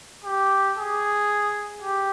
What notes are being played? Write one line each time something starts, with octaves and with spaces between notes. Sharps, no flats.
G4
G#4
G4